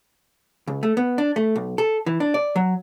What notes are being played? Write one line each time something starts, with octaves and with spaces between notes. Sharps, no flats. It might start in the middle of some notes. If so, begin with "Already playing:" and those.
C#2
A3
B3
D4
A3
B1
A4
E3
D4
D5
F#3